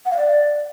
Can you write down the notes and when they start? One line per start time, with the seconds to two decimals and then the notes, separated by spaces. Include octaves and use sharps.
0.05 F#5
0.11 F5
0.17 D5